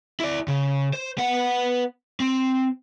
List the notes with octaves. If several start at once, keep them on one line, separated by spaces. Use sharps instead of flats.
E4 D5
C#3
C5
B3 F#5
C4